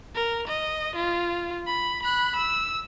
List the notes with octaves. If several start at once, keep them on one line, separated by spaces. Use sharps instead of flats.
A#4
D#5
F4
B5
B5 F#6
E6